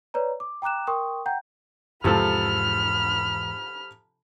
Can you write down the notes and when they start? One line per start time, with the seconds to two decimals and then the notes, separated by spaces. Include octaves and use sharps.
0.14 B4 C#5 D5 A#5
0.40 D6
0.62 G5 A#5 D6 F#6 E7
0.87 A#4 G5 C6 C#6 D#6
1.26 F#5 G5 A#5 G6
2.04 E2 G#2 C3 F3 A4 B5 F6